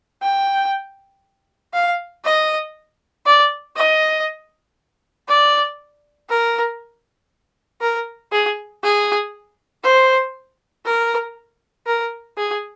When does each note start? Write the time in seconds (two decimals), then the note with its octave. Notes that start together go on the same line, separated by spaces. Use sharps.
0.22 G5
1.74 F5
2.25 D#5
3.26 D5
3.77 D#5
5.29 D5
6.30 A#4
7.81 A#4
8.33 G#4
8.84 G#4
9.84 C5
10.86 A#4
11.87 A#4
12.38 G#4